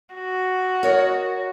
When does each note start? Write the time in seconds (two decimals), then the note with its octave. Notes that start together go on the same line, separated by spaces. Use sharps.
0.15 F#4
0.83 A#4 C#5 D#5